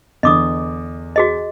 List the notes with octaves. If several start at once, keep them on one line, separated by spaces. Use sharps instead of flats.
E2 D3 D#5 D6 D#6
F#4 G#4 D#5